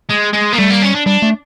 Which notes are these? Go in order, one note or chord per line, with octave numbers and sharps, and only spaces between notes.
G#3
G#3
A#3
G3 A3
A#3
C#4
D4
G3 D4
A3